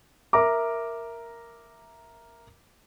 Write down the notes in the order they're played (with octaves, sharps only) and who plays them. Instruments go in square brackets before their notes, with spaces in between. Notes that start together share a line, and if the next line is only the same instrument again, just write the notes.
[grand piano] A#4 E5 A#5 D6